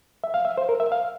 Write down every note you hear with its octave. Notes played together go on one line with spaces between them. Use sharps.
E5
F5
E5
C5
A#4
E5
F5